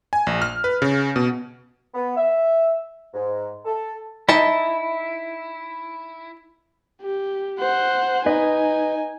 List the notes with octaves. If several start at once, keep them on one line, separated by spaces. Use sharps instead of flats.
G#5
A#1
F6
B4
C#3
B2
B3
E5
G#2
A4
D#4 E4 A5
G4
C5 F#5
D#4 B4 D#5 G#5